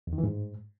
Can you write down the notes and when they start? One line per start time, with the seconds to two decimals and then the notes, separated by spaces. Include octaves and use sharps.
0.07 E2
0.13 D#3
0.18 E3
0.24 G#2